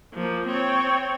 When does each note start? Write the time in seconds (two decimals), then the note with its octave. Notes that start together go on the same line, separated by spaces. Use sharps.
0.14 F3 A#3
0.47 C4 C#5